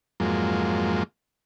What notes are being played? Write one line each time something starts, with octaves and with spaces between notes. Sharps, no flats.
F2 G#2 F#3 G#3 A#3 F4